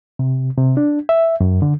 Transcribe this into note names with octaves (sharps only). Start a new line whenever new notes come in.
C3
C3
D4
E5
F#2
D3